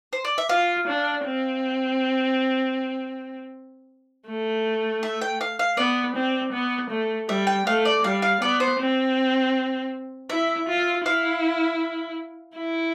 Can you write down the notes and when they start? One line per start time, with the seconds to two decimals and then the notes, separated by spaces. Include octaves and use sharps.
0.13 C5
0.25 D5
0.38 E5
0.49 F4 F5
0.88 D4
1.25 C4
4.28 A3
5.03 E5
5.21 G5
5.41 F5
5.59 F5
5.77 B3 D5
6.16 C4
6.53 B3
6.90 A3
7.29 G3 E5
7.47 G5
7.66 A3 F5
7.85 D5
8.04 G3 F5
8.22 F5
8.42 B3 D5
8.60 C5
8.79 C4
10.30 E4 E5
10.68 F4
11.06 E4 F5
12.57 E4